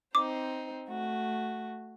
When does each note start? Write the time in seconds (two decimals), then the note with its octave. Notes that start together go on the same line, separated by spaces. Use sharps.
0.15 C4 D#4 C5 D6
0.89 A3 F#4